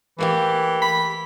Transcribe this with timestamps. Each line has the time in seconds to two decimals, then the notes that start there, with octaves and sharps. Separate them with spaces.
0.19 E3 A3 A#3 G4
0.82 B5